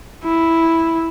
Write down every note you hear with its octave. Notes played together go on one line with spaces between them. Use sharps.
E4